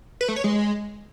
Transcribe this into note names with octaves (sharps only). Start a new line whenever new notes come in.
B4
A3
C#5
G#3